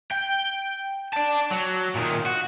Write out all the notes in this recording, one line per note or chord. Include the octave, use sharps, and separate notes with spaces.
G5
D5 A5
F#3
A#2 D#3
F#4